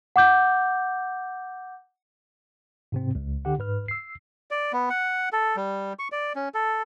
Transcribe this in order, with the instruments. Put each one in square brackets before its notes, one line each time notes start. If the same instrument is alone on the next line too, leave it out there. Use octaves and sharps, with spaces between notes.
[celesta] F#5 D6 G6
[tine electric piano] G#2 C3 C4
C#2
D3 G4 F#5
G#2 B4 F6
E6 C7
[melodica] D5
B3
F#5
A4
G3
C#6
D5
C#4
A4